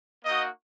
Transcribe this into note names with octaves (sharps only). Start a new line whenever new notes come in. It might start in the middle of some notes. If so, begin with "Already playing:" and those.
A#3 D#4 F#4 D#5